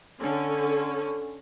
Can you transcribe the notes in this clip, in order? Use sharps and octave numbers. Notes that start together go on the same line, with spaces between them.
D3 C#4